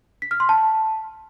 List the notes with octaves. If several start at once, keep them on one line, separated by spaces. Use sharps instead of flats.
B6
F6
C6
A5